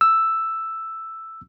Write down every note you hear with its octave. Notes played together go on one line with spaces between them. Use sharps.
E6